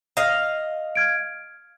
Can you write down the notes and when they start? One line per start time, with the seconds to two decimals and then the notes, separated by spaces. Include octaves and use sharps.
0.17 D#5 F5
0.95 F6 G#6 D7